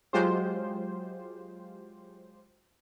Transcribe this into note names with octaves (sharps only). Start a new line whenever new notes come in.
F#3 G#3 F4 G4 C5